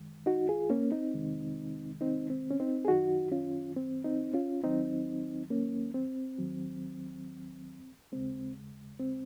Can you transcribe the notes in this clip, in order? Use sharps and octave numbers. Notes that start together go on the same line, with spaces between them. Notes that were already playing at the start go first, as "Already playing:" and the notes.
Already playing: F#2 D#3 G#3
D#4 F#4
F4 G#4
A#3 C#4
C4 D#4
F2 C3 D#3 G#3
C4 D#4
C4
C#4
C4 D#4
G#4
F#2 D#3 F#3 D#4 F#4
C#4 F4
C4
C4 D#4
C#4 F4
D#2 D#3 F#3 C4 D#4
A#3 C#4
C4
D#2 D#3 F#3
D#2 C#3 G#3 C4
C4